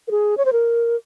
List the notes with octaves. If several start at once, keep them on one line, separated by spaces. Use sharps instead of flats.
A#4
G#4
C#5
C5
A#4